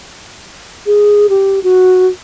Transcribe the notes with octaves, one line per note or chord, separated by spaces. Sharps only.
G#4
G4
F#4